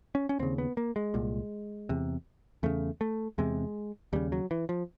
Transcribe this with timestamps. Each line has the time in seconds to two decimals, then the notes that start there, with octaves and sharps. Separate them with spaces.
0.15 C#4
0.29 C#4
0.39 D#2 C#3 C4
0.58 B3
0.77 A#3
0.96 G#3
1.14 C2 A#2
1.89 E2 C3
2.63 E2 C#3 A3
3.01 A3
3.38 E2 C3 G#3
4.13 D#2 C#3 G3
4.32 F#3
4.51 E3
4.69 F3